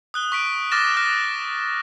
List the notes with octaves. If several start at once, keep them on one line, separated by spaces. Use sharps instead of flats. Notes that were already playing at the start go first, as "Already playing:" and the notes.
D#6 F#6 G7
C#6 B6 D7
D6 F6 A6 A#6 E7
D#6 F6 F#6 A#6 E7